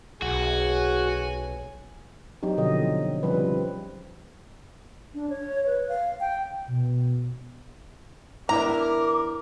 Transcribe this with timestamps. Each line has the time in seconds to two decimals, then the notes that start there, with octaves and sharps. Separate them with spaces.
0.22 B1 F#4 G#4 G#5
2.43 F#3 C4 D#4 G4
2.57 B2 D3 F3 F#3 D#5
3.23 C#3 F3 G3 C4 B4
5.14 D4
5.29 C#5
5.66 B4
5.89 F5
6.20 G5
6.67 B2
8.49 E2 D4 E4 A#4 A#5 D6